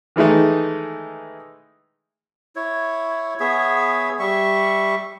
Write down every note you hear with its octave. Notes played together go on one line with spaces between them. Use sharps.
D#3 E3 G#3 A3 D#4
E4 C#5
B3 G#4 C#5 E5
G3 E5 C#6